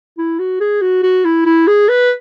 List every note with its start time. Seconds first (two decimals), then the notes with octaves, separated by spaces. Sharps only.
0.18 E4
0.39 F#4
0.60 G#4
0.81 F#4
1.03 F#4
1.25 E4
1.45 E4
1.67 G#4
1.89 B4